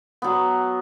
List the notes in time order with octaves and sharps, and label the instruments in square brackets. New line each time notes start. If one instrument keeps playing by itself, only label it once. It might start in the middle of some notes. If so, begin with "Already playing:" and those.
[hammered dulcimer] F#3 B3